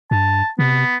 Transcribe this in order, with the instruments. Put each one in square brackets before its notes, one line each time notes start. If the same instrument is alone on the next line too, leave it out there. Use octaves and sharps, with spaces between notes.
[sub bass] G2 [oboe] A5
[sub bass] C3 [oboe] B3